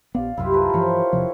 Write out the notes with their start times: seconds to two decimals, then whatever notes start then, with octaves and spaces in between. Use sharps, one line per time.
0.15 A#1 B3 D5 F5
0.37 C2 F#2 E4 F4 G4
0.52 A#4 B4 A5
0.73 G2 E3 F3 C5 C#5
1.13 E1 C3 F3